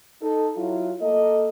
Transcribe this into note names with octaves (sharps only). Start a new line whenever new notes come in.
D#4 A4
F#3 E4 F4
A#3 A4 D#5